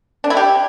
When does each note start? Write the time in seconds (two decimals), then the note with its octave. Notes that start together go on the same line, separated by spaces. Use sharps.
0.24 D4
0.30 E4
0.37 G4